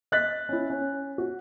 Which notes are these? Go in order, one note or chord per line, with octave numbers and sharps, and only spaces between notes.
D#5 F#6 A6 B6
C#4 E4
C#4
F#4